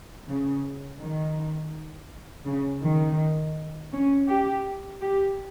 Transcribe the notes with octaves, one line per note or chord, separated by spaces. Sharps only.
C#3
D#3
C#3
D#3
C#4
G4
G4